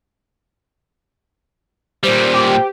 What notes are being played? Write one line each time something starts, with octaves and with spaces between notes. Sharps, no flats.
A#2 G3 C5
G4